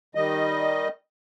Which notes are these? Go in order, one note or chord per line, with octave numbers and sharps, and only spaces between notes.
D#3 G3 D#5